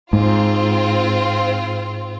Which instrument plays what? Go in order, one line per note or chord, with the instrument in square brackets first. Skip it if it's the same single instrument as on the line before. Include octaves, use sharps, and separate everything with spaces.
[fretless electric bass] G#2 [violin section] C4 F4